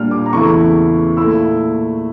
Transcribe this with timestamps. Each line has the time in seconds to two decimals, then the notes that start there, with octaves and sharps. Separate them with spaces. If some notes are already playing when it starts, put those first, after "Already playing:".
Already playing: A#2 G3 D4 F6
0.11 D6
0.26 A#5
0.32 E2 C#3 E3 A3 E4 C#6
1.17 A#2 A3 E4 E6